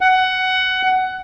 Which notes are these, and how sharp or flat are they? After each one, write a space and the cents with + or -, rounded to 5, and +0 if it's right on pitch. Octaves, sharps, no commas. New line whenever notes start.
F#5 +15